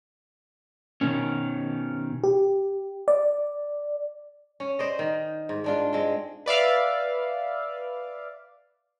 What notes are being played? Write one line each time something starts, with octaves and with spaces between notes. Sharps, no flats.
B2 D#3 C#4
G4
D5
C#4
C5 D5 D#5
D#3
G#2
G#3 D4 F4
G#3 C4
B4 D5 E5 F5